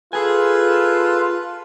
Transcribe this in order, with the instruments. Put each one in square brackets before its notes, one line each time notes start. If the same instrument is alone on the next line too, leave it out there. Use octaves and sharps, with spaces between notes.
[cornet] F4 [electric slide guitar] G#4 G#5 [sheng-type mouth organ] A4 B4